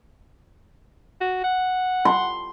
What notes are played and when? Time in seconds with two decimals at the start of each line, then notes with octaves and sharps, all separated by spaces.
1.21 F#4
1.44 F#5
2.05 C6